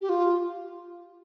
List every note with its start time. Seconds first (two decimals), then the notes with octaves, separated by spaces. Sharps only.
0.01 G4
0.09 F4